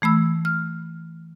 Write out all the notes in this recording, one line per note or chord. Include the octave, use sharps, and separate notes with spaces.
E3 A3 B5 E6
F6